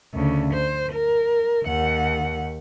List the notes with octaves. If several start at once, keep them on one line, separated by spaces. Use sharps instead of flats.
D2 C#3
C5
A#4
D#2 F#5